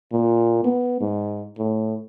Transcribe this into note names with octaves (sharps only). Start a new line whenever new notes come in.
A#2
B3
G#2
A2